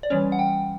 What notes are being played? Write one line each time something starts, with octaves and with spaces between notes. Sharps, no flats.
D5
E3 G3 C#4 C#5
F#5
G5